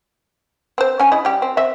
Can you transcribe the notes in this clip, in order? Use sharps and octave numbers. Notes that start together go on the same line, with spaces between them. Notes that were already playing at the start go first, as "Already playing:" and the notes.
C4 C5
C#4 G#5
C#3 E4 D#5
G3 G4
C4
C4 E5